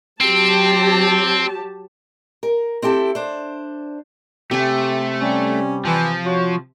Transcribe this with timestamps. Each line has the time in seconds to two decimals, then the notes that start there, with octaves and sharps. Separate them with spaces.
0.21 F#3 C4 G4 A5
2.43 A#4
2.82 C4 E4 G4 A4
3.15 D4 C5
4.51 C3 A3 G4 G#5
5.21 G3 C#4
5.85 E3 F3
6.26 F#4 C#5